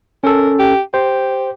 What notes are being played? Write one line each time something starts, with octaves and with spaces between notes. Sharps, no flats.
C#4 A4 A#4
G4
G4 C5